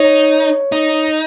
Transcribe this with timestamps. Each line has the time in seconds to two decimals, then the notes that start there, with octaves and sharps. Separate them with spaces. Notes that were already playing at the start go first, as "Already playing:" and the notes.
Already playing: D#4 C#5
0.72 D#4